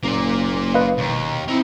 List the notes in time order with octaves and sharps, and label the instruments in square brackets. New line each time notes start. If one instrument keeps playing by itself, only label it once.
[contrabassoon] F#1 [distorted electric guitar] A#3 D5
[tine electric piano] B4 D#5 F5
[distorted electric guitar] D#2 [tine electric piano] B2
[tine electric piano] C4 E4 [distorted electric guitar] D#4 E5